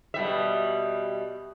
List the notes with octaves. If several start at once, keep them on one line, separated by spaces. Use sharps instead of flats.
B2 G3 E5